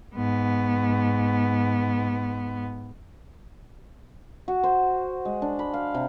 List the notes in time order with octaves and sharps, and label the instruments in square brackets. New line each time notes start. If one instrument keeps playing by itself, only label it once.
[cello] G#2 B3
[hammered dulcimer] F#4
C5
G#3
D4
B5
F5
C3